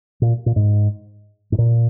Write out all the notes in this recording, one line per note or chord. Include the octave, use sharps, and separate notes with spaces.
A#2
A#2
G#2
G#2
A#2